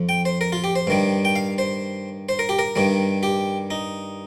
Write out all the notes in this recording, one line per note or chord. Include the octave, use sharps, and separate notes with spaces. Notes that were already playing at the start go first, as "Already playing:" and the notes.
Already playing: F2 F3
G5
C5
A#4
F4
G4
C5
G2 D#3 G3
G5
F5
C5
C5
A#4
G4
A#4
G2 D#3 G3
G4
D#4